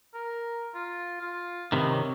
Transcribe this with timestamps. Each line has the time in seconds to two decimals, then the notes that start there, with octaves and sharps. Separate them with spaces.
0.14 A#4
0.74 F4
1.21 F4
1.72 C3 D#3 B3
1.90 C#5